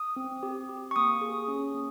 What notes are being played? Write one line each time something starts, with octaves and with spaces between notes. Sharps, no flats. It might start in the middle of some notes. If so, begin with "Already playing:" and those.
Already playing: D#6
C4
G4
G4
C#6
A#3 D#6
G#4
C#4
A#3